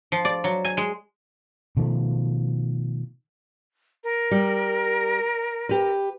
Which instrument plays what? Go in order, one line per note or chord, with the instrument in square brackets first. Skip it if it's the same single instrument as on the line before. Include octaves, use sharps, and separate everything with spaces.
[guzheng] F3
D5
F#3
G#5
G#3
[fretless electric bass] B2 D#3 F3 A3
[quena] A#4
[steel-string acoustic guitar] G3
G4 B4